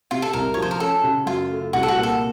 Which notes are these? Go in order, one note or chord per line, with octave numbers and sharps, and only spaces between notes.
C3 F4
A4
C2 A#4
F3 C#5
C5
A#4
C#4 A4
C#3
F#2 F4
A3
C2 F#4
A4
F#4
A#2
A4